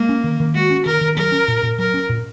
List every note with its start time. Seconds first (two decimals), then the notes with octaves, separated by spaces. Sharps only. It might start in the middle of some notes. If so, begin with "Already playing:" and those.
Already playing: G#3 A#3
0.09 C#4
0.24 D#3
0.40 D#3
0.55 G#3 F#4
0.70 C#4
0.86 D#3 A#4
1.01 D#3
1.17 F#3 A#4
1.32 C#4
1.48 A#2
1.63 A#2
1.79 F#3 A#4
1.94 C#4
2.09 A#2